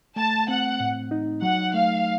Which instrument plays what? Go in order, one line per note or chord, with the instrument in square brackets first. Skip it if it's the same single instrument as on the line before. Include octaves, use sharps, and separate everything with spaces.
[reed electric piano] A3 [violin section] A5
[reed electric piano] C4 [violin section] F#5
[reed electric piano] A2
D#4
[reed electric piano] F#3 [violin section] F#5
[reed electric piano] A3 [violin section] F5